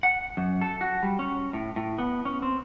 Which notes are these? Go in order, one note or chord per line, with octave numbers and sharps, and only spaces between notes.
F#5
F#2
A4
F#4
G3
C#4
A2
A2
B3
C#4
C4